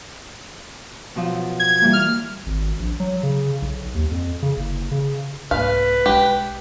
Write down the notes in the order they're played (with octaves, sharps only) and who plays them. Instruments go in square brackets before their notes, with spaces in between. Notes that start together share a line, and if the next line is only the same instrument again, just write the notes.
[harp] B2 F3 F#3
[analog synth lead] G#6
[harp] E3 G3 A#3
[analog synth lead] F6
[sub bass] G#1
A#1
F#3
C#3
B1
D#2
F2
C#3
F#1
C#3
[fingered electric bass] C2 G#2 A#3 [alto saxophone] B4 [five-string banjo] F5
[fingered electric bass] B1 G#3 [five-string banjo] G4